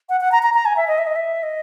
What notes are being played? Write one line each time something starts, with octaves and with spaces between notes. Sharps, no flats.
F#5
F#5
A#5
A#5
A#5
G#5
E5
D#5
E5
D#5
E5
D#5